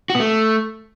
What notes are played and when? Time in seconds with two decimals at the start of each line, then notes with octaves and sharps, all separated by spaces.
0.10 F#4
0.15 B3
0.20 A3